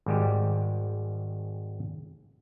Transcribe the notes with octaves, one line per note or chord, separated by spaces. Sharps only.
G#1 G#2 G3 G#3 G4